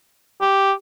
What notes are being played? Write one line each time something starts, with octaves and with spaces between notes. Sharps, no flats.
G4